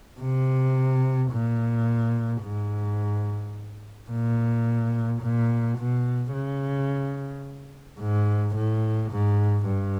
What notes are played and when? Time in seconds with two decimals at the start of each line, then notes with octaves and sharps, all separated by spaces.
0.21 C3
1.32 A#2
2.43 G#2
4.10 A#2
5.21 A#2
5.78 B2
6.33 C#3
8.00 G#2
8.55 A2
9.11 G#2
9.67 G2